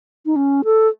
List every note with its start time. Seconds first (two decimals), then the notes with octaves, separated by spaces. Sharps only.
0.26 D#4
0.36 C#4
0.64 A4